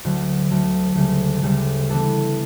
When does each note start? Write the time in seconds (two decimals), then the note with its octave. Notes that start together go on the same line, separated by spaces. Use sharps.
0.04 D2 D3 F#3
0.50 D2 D3 F#3
0.95 D2 C#3 G3
1.43 D2 C#3 G3
1.90 E3 B3 D4 A4